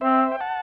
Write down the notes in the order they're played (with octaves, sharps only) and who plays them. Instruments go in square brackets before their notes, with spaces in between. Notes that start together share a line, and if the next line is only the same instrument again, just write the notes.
[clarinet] C4 [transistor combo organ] C5 E5
[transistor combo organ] G5
F#5 A5